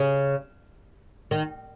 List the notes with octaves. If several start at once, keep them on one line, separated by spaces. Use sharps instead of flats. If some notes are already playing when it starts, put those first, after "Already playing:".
Already playing: C#3
D#3